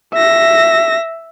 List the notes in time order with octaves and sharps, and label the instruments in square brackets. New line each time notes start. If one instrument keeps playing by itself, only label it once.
[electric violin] E5 A#6